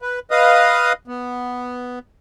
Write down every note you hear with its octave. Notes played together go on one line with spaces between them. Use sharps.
B4
B4 D#5 F5 D#6
B3